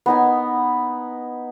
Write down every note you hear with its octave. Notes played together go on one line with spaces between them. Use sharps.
B3 D#4 G#5